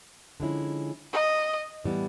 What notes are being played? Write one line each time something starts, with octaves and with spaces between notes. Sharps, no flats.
D3 F3 G#3 C#4 E4
D#5
A2 E3 G3 B3